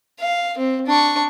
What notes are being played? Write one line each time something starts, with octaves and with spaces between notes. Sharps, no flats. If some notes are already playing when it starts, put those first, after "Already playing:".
F5
C4
D4 C#6